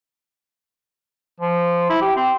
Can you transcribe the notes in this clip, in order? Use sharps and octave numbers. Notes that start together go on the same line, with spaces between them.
F3
E4
G4
C4